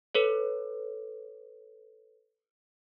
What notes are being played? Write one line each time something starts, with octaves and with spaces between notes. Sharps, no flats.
A4 B4 C#5